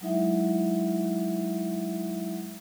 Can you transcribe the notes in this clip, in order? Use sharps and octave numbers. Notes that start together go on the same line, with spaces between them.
F#3 G#3 D#4 E4 E5 F#5